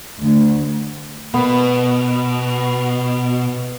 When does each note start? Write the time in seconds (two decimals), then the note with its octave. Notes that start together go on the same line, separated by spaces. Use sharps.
0.21 D2
1.34 B2 B3